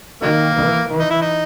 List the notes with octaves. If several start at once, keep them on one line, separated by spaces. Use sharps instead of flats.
D#3 F#3 A#3
E3
E3
D#4
E4
D#4